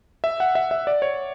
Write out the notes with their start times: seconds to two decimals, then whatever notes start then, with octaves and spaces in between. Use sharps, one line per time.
0.24 E5
0.40 F#5
0.55 E5
0.71 E5
0.87 D5
1.02 C#5